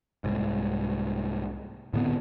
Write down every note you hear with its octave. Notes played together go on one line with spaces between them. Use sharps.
C2 G#2
A2 D3 B3 C4